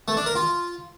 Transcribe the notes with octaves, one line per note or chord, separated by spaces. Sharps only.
A3
D4
A#4
F4